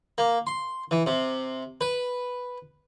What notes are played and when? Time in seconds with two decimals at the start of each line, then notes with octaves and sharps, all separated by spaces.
0.18 A#3
0.47 C6
0.91 E3
1.06 C3
1.81 B4